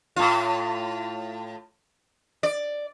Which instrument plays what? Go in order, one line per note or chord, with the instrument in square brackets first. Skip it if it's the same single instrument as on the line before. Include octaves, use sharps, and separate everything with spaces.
[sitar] A2 F4
D5